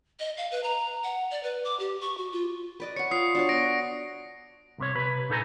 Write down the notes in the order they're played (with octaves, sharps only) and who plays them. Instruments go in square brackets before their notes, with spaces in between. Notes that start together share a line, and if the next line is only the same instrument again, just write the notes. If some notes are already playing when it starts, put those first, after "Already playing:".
[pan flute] D#5
F5
B4
A#5
F#5
D5
B4
D6
G4
C#6
F#4
F4
[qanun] B4 D5 D#5
[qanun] C#5 F#5 [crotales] C#7
[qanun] F4 [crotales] D#6 C7
[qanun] D4 F#4 C#5
[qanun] B3 [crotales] A#6 D7
[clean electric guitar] C2 C3 C#5
C3 B4 B5
A#2 D#4 A4 C#5 G#5 A#5